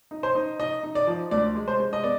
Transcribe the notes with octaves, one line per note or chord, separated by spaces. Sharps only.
D#4
C5
D#4
D#4 D#5
D#4
D5
F3
D2 D5
G#3
C5
G#3
D#5
B3 D5